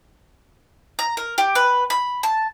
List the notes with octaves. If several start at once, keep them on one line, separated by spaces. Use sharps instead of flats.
A#5
A#4
G4
B4
B5
A5